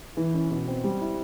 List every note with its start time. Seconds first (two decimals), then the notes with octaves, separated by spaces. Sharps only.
0.17 E3
0.34 C#4
0.51 B2
0.68 C4
0.84 G3
1.01 E4